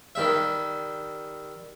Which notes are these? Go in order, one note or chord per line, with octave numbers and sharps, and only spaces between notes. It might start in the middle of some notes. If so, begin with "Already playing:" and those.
D#3 G3 E5